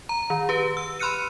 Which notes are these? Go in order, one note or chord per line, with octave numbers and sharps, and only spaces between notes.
A#5
D#3
G4 B4
E6
B5 C6 F6 F#6 C#7 D#7